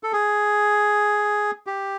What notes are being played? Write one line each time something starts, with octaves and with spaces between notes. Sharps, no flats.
A4
G#4
G4